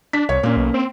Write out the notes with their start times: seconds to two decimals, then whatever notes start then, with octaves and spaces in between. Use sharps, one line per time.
0.13 D4 B6
0.29 C2 C#5
0.43 A#2 A#3 C#4
0.57 B1
0.74 C4